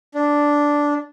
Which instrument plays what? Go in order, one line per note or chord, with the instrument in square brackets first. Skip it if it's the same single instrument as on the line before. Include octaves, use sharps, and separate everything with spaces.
[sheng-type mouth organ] D4